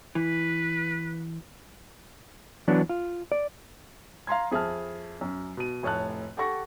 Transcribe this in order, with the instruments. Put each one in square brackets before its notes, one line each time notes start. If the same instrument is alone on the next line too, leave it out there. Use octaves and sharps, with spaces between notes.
[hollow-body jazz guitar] E3 [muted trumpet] B4
[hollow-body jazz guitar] E3 F#3 B3 D4
F4
D5
[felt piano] F5 A#5 C6 G#6
F2 G#4 E5 A5 F6
F#2
B2 D#7
F1 A2 C#5 A5 F#6
G4 A4 F#5 C#6 A#6